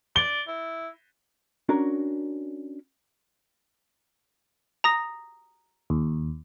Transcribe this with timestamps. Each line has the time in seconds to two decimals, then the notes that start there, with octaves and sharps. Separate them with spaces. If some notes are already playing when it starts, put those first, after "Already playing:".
0.16 D5 G7
0.48 E4
1.69 C#4 D4 F#4 A#4 A#5
4.84 A#5 D#6 A#6
5.90 D#2